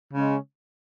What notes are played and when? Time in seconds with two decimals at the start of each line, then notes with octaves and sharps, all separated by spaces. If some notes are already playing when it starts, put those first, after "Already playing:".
0.12 C#3 G#3 C#4